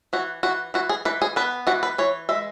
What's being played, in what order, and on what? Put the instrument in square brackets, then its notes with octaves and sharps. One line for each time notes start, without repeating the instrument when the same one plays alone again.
[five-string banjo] E3 F#4
E3 F#4
E3 F#4
G#4
E3 B4
G#4
B3 B4
E3 F#4
B4
E3 C#5
G#3 E5